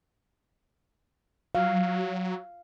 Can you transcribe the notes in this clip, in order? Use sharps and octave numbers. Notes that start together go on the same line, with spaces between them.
F#3 F5